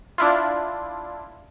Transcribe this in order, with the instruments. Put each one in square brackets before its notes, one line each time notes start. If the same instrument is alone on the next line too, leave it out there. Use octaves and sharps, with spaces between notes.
[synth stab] D4 E4 F4